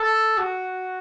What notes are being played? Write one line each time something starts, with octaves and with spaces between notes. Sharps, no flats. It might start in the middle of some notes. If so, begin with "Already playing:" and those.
Already playing: A4
F#4